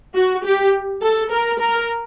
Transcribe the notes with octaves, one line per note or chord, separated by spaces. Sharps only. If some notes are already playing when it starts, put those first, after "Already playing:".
F#4
G4
A4
A#4
A#4